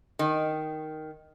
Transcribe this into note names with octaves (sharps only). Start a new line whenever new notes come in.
D#3